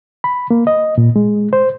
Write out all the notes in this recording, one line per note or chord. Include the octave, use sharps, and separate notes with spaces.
B5
A#3
D#5
A#2
G#3
C5